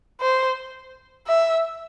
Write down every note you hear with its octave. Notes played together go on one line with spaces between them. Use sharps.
C5
E5